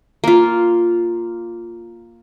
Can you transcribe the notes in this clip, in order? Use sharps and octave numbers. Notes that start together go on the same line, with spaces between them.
A#3 F4